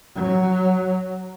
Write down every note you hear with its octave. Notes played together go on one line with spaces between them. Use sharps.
F#3